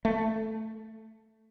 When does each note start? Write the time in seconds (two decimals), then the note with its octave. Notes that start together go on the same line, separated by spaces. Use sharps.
0.05 A3